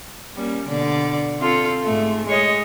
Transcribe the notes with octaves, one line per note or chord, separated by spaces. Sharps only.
G3 A#3 C#4
B2 D3 D5
C4 F4 A4
G#2 A3
G#3 C#5 D#5